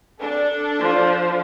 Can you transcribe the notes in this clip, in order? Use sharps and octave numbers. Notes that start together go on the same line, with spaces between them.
D4 A4
F3